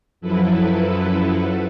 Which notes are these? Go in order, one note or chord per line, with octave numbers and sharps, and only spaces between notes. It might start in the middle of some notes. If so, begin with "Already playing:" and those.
F#2 F3 F#3 E4 A4 B4